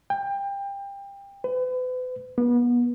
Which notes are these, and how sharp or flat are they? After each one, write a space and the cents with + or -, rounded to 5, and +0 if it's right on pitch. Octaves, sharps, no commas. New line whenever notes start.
G5 +25
B4 +40
B3 -30